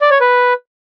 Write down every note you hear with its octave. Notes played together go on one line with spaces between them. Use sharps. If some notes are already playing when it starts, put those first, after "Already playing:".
D5
C#5
B4